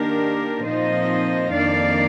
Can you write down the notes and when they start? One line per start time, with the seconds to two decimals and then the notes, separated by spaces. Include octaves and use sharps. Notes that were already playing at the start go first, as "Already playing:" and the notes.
Already playing: D#3 A#3 D4 G4 A#4
0.64 A#2 F3 C4 D#4 C5 D#5
1.52 F2 D#3 A#3 D4 D5 F5